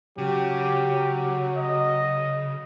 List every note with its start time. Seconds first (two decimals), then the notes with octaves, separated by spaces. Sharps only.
0.18 C#3 F#3 G4
1.56 D#5